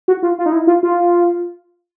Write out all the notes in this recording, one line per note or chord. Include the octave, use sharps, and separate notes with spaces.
F#4
F4
F4
D#4
E4
F4
F4